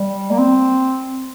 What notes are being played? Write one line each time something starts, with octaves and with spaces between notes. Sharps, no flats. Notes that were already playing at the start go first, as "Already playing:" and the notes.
Already playing: G3
A#3
C4